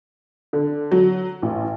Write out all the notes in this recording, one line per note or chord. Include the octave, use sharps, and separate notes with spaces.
D3
F#3
A1